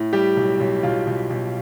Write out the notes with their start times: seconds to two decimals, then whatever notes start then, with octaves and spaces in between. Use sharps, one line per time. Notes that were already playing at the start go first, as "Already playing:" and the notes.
Already playing: A2
0.13 G3 G4
0.37 B1
0.60 B1
0.83 B1 F4
1.07 B1
1.30 B1